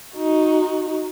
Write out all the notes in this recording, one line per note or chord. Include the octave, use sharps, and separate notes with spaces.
D#4 F#4